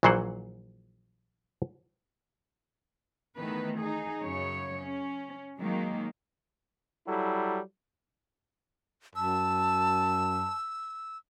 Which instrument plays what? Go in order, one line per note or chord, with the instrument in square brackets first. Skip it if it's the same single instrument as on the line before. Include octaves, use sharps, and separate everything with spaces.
[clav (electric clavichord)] A#1 A#2 E3 F#3 C5 F#5
[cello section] D#3 E3 A3 B3 B4
D#4 G#4
F#2 C#3 C#5
C#4
D#3 F#3 G#3 A#3
[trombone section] F#3 G3 E4 A4
[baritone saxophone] F#2 [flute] A5 [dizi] E6